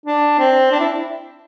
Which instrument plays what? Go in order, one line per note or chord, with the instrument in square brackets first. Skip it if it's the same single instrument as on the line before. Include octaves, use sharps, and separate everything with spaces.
[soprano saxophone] D4
C4
D4
E4